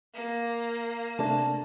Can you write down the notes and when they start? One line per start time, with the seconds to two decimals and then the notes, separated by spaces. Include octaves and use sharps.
0.14 A#3
1.19 C3 A3 D4 A5